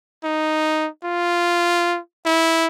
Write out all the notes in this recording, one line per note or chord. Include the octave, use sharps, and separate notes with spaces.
D#4
F4
E4